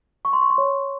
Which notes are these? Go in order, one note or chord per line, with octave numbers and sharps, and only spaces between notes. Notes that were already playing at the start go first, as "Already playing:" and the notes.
C#6
C6
C#6
C6
C#5